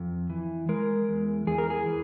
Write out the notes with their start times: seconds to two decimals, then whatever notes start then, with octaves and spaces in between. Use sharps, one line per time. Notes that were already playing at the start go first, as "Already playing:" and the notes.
Already playing: F2
0.30 E3
0.69 G#3 A#4
1.09 E2
1.47 E2 G#4
1.58 A#4
1.70 G#4
1.86 E3